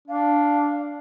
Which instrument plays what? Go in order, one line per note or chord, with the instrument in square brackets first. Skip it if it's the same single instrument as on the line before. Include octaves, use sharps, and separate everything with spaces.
[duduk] D4 [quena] F5